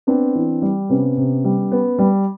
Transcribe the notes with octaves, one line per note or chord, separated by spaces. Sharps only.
B3 C4 D4
E3
G3
C3 B3 C#4
C3
G3
B3
G3